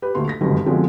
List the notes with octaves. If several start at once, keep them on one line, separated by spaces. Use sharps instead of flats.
G4 B4
D2 A#2 A3 C6
A#6 B6
G1 C#2 F#2 C3 D#3
B2 D3 F3 G#3 C4 C#4